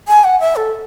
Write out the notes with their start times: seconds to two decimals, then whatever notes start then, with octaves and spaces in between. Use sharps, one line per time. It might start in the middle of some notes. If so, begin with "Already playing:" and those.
0.08 G#5
0.24 F#5
0.40 E5
0.56 A4